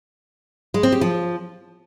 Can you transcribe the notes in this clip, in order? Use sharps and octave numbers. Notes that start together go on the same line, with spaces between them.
G#3
C4
G4
F3